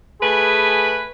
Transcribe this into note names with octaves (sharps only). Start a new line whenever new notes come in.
A3 G#4 B4 G#5 B5